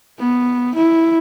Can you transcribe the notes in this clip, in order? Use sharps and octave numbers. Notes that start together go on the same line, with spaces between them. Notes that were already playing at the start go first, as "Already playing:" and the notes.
B3
E4